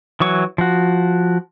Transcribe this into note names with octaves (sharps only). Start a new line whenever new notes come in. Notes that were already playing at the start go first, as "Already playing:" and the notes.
E3 F#3 C#6
F3 F#4